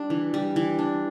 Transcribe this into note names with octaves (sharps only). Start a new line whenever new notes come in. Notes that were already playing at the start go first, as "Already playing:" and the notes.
Already playing: G3 D4
E3
G3
E3
D4